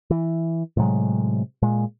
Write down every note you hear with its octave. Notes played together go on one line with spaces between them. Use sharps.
E3
A2 C3 F#3 G#3
A#2 G#3